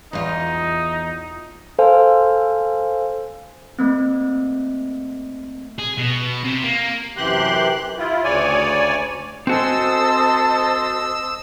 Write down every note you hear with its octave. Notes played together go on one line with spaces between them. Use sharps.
E2 D#4 F4
A4 C5 F5 G#5
A3 A#3 C4
G#4
B2
C3
A#3
F#2 C3 E3 G4 C6 F#6
E4 F4
D2 C#3 C#5 D5 G#5
C4 F#4 A4 C5 D#5 G#5 A5 E6